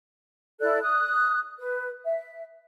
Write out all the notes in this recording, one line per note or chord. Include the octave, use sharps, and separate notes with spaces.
E4 A4 D5 F#6
D#6 F#6
B4
E5